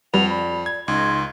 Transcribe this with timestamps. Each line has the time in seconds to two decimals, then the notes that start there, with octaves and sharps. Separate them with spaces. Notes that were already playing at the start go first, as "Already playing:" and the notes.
0.14 F2 G3 B4 F#5 F7
0.30 D5 B5
0.66 G#6
0.88 C#2 D#4 D#5 C6 G#6